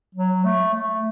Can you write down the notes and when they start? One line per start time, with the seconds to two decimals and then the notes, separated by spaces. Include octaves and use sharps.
0.15 F#3
0.44 A3
0.74 A3